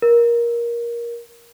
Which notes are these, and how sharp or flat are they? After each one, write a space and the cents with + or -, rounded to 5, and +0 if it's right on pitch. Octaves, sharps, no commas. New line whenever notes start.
A#4 +15